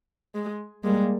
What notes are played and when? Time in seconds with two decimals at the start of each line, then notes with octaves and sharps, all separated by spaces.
0.35 G#3
0.84 G3 G#3 A#3